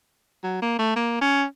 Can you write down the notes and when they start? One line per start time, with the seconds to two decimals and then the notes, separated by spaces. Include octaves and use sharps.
0.44 F#3
0.62 A#3
0.79 A3
0.96 A#3
1.21 C#4